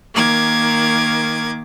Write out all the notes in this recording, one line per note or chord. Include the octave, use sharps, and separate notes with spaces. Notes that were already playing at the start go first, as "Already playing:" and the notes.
D#3 A#3 D6 G#6